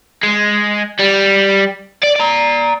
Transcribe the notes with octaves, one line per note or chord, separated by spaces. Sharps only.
G#3
G3
D5
D5 A#5